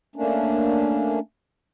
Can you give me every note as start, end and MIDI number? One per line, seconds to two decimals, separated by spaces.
0.16 1.19 57
0.16 1.19 58
0.16 1.19 61
0.16 1.19 62